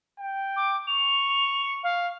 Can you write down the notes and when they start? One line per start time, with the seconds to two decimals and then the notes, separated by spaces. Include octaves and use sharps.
0.19 G5
0.56 D6
0.87 C#6 F7
1.83 F5